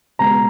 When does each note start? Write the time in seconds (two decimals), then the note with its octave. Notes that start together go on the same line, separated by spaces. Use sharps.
0.19 C#2 B2 G#3 B3 A#5